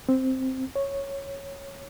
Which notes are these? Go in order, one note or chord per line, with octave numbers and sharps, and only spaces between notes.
C4
C#5